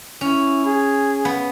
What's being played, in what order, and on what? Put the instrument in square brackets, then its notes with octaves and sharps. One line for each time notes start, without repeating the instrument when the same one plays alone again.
[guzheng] C#4 [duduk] E4
[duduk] G#4
[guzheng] B3